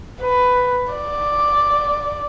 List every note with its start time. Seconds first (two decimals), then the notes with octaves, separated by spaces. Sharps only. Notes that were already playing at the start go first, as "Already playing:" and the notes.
0.21 B4
0.93 D5